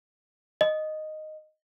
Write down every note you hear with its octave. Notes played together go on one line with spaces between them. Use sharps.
D#5